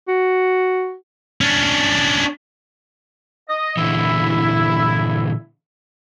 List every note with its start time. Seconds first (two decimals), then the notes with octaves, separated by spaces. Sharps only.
0.08 F#4
1.41 C#4 D4
3.49 D#5
3.77 A#2 D3 E3 E4